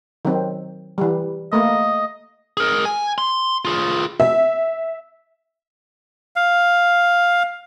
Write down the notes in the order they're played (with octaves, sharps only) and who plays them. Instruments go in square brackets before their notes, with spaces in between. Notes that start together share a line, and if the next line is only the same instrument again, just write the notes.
[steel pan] D#3 F#3 C4
E3 G3
[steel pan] A3 A#3 [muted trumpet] D#5
[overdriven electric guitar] G#4 A#4
G#5
C6
F4 G#4
[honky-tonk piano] E5
[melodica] F5